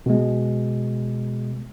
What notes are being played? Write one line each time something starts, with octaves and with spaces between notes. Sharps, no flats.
B2 G#3